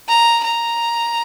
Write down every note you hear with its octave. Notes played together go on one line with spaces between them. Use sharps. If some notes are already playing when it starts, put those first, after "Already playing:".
A#5
A#5